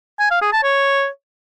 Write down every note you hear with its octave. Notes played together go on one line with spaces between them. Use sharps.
G#5
F5
G#4
A5
C#5